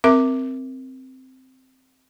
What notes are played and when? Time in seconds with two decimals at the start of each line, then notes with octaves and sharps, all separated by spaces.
0.04 C4 A#4 E5 D6